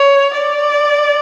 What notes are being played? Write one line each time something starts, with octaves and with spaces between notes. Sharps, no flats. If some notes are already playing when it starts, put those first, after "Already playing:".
Already playing: C#5
D5